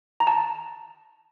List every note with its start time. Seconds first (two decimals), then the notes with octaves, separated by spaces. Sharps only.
0.20 A#5
0.27 A5